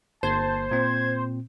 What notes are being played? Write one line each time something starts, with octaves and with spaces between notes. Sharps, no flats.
G1 A#3 C5 A5 G#6
A#2 C4 G#6